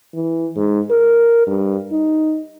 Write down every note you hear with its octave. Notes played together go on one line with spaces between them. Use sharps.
E3
G#2
A#4
G2
D#4